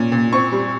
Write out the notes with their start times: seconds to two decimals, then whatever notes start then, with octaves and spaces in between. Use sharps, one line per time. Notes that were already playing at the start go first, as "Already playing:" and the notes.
Already playing: A#2 C#4
0.12 A#2
0.33 C4 C#6
0.52 G3